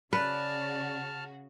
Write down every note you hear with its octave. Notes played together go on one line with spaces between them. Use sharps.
C#3 F#4 B4 D5 A5 F6